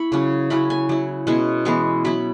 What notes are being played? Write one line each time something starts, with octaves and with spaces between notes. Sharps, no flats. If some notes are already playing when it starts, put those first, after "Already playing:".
Already playing: E4 B5 C#6
C#3 F#3 C#4
F#3 C#4 E4 B5
G#5
F#3 E4
B2 G#3 C#4 E4
E3 G#3 B3 E4 C#6
F#3 E4 B5